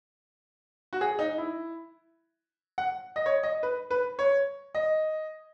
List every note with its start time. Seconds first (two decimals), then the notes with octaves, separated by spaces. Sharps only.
0.93 F#4
1.01 G#4
1.19 D#4
1.38 E4
2.78 F#5
3.16 D#5
3.26 C#5
3.43 D#5
3.63 B4
3.90 B4
4.19 C#5
4.75 D#5